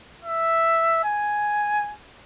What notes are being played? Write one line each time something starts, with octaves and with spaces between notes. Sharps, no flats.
E5
G#5